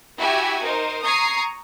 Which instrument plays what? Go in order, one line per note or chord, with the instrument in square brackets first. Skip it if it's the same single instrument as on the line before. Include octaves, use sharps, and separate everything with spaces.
[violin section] E4 F#4 G4 E5 G#5 G#6
D#4 A#4 C5
A#5 C#6 D#6 G#6 C7